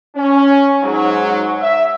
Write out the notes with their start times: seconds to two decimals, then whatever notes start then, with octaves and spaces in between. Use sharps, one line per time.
0.16 C#4
0.82 G#2 F#3
1.61 E5